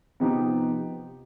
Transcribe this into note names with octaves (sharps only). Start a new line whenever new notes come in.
C3 F3 B3 D#4 G4